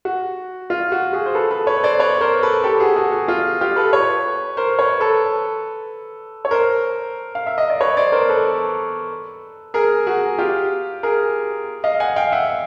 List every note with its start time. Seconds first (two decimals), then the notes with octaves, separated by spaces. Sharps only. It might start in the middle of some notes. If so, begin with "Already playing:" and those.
0.05 F#4
0.70 F4
0.92 F#4
1.13 F#4 G#4
1.26 C5
1.35 A4 B4
1.51 A4 B4
1.67 B4 C#5
1.83 C5 D5
1.99 B4 C#5
2.21 A#4 C5
2.43 A4 B4
2.64 G4 A4
2.80 F#4 G#4
2.96 F#4 G#4
3.12 F#4
3.28 F4
3.61 F4 G4
3.76 A4 B4
3.93 B4 C#5
4.57 A#4 C5
4.79 B4 C#5
5.00 A4 B4
6.45 C#5
6.51 A#4 C5
7.35 F5
7.47 E5
7.58 D#5
7.70 D5
7.81 B4 C#5
7.97 C5 D5
8.12 A#4 C5
8.29 A4 B4
9.74 G#4 A#4
10.07 F#4 G#4
10.38 F4 G4
11.03 G#4 A#4
11.84 D#5 F5
12.00 F#5 G#5
12.16 F5 G5
12.32 E5 F#5